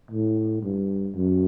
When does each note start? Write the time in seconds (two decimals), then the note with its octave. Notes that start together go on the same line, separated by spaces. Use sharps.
0.11 A2
0.63 G2
1.15 F#2